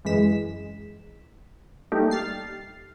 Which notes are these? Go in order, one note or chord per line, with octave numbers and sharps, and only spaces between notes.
F#2 E3 G#3 B6 E7
G3 A3 A#3 D#4 G4
F6 A6 C7